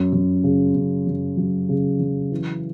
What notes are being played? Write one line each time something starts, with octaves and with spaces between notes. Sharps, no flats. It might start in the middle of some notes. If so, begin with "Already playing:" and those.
Already playing: F#2
F#2
C#3
F#2
F#2
F#3
C#3
F#3
E3